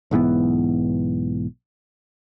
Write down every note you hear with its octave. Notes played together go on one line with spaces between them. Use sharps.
B1 G#2 E3 B3